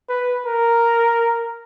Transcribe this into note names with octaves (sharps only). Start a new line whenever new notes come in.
B4
A#4